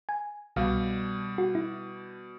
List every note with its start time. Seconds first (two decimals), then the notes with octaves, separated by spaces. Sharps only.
0.09 G#5
0.56 C2 B2 G3 F5
1.38 F#4
1.55 E4